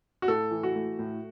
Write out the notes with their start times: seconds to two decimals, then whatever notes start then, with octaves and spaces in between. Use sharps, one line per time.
0.22 F#4
0.28 A2 A4
0.51 E3
0.63 F#4
0.75 A3
0.99 A2